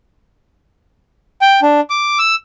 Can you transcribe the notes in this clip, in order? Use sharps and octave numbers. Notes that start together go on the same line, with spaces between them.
G5
D4
D6
E6